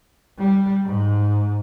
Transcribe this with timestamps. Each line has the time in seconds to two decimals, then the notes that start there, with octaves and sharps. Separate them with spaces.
0.38 G3
0.85 G#2